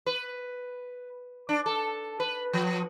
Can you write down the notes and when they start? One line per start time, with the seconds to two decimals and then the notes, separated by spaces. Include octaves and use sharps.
0.06 B4
1.49 D4
1.66 A4
2.20 B4
2.53 F3